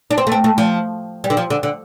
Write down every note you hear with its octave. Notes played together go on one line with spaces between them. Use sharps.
D4
C4
A3
C4
A3
F3
G3
D3
F3
D3
D3